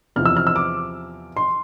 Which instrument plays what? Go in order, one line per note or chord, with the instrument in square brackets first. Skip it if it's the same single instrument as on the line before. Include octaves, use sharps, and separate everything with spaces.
[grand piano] E2 C3 F3 F6
E6
F6
E6
D6
C6